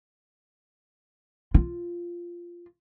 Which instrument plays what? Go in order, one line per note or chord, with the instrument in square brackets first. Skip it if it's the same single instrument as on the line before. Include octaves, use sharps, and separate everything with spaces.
[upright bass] F4